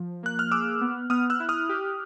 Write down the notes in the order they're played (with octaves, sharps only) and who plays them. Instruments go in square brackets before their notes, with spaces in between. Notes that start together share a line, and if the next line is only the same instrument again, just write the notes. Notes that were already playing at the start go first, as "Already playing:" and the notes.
Already playing: [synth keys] F3
[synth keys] A#3 [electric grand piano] F#6
[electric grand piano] F6
[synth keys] G#4 [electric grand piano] D6 E6
[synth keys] B3
[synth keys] B3 [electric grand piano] D#6 F6
[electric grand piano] E6 F#6
[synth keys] E4
[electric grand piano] D#6 F6
[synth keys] G4